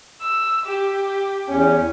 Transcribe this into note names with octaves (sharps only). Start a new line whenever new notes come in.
E6
G4
E2 C#4